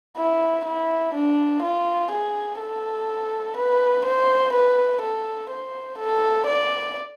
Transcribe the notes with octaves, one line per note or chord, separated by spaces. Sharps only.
E4
E4
D4
F4
G#4
A4
B4
C5
B4
A4
C5
A4
D5